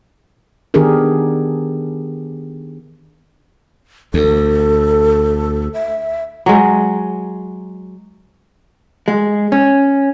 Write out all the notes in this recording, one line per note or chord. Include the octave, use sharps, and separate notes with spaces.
D#3 B3 D4 G4 G#4 A#4
D2 A4
E5
F#3 G#3
G#3
C#4